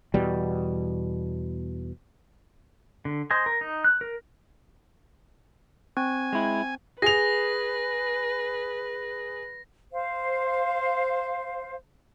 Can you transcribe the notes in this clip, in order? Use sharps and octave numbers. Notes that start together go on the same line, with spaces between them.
E2 B2 G3
D3
C5 D#5 G#5
A#4
D#4
F#6
A#4
C4 G#5
G#3 E4
G#4 B4 A#6 F7
C5 F5